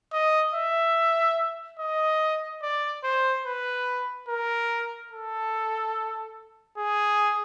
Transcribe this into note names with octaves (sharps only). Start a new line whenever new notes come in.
D#5
E5
D#5
D5
C5
B4
A#4
A4
G#4